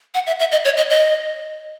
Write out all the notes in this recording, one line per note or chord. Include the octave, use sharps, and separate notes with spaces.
F#5
E5
E5
D#5
C#5
D#5
D#5